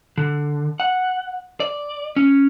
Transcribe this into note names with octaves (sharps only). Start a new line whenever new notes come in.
D3
F#5
D5
C#4